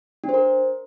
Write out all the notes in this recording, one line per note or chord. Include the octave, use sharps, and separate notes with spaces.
D4
C5
A#4